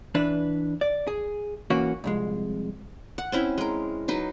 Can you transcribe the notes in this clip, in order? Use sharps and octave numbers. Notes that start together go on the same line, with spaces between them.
E3 D4 B4
D5
G#4
E3 A#3 C#4 F#4
C2 F2 G#3
F#5
C4 C#4 E4
G#3 A#4
F#3 D#4 B4